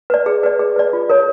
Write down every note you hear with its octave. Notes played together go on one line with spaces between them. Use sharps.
B4 D5
G#4
B4 D5
G#4
B4 D5
F4
A#4 C#5